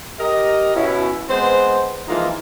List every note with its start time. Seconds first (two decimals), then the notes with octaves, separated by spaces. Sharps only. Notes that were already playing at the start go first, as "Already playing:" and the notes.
0.19 G4 A#4 D#5
0.75 B2 C#4 E4
1.29 G#3 B3 C4 C5
2.08 E3 F3 G#3 A#3 D#4 F4